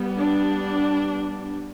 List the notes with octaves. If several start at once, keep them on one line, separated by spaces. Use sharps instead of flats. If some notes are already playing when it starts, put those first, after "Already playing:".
Already playing: G3 B3
D4